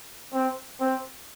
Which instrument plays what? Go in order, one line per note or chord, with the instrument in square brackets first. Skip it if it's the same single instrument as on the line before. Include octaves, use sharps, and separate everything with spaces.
[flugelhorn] C4
C4